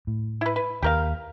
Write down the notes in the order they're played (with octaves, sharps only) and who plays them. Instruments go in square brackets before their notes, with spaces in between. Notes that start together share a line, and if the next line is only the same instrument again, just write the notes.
[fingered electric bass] A2
[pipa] E4 B4
B4
[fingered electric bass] D#2 [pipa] G4 A#4 F5